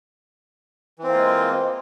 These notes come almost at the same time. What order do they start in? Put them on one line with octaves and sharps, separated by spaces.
E3 C4 A#3 F4 G#3